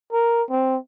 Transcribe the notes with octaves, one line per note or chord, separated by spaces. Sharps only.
A#4
C4